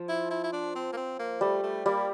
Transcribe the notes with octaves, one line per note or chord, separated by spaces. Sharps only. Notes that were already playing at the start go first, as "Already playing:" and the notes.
Already playing: F3
E4
E4
E4
D4
C4
A#3
C4
A#3
G3 A3
A3
G3 A#3